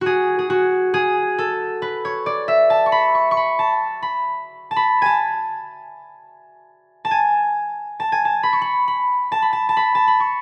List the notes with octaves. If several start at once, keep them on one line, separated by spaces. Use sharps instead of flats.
F#4 G#4
G#4
F#4
G#4
A4
B4
C#5
D5
E5
A5
C#6
B5
C#6
C#6
B5
A5
B5
A5
B5
G#5 A5
A5
G#5
A5
G#5
A5
B5
C#6
B5
B5
A5
B5
A5
A5
B5
A5
B5
C#6